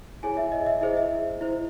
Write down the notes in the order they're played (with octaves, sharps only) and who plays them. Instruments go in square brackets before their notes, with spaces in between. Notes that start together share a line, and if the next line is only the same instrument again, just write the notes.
[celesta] E4 G#4 C#5 G#5
E5
D#5
E5
E4 G#4 C5 D#5
E5
E4 C5